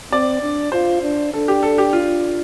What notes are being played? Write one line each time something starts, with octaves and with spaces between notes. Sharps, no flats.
C4 D5
D4
F4 C5
D4
D4 A4
G4
A4
G4
F4